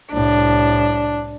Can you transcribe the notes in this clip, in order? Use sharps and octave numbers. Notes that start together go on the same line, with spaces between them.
C2 A2 D4